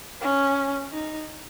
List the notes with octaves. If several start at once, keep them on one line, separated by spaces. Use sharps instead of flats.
C#4
D#4